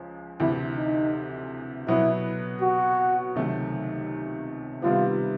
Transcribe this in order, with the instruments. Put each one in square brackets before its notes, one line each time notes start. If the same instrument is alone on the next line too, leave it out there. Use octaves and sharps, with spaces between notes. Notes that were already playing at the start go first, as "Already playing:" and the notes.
Already playing: [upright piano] C#2 C#3 F3
[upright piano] D2 C3 E3 [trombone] E4
[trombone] D#4
[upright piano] B2 F#3 B3 [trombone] E4
[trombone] F#4
[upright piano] C#2 C3 D#3 F#3 A3
[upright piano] C3 D#3 G3 B3 [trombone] F4